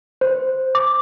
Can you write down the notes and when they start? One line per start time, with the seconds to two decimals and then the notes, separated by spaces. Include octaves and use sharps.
0.21 C5
0.75 D6